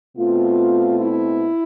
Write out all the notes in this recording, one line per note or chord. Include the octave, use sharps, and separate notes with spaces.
B2 A3 C4 F4
E4